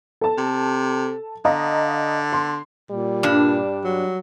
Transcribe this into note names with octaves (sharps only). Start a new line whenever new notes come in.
A4 A5
C3
D3 D#5 F5 A#5
C6
A#2 G3
G2 D4
F#3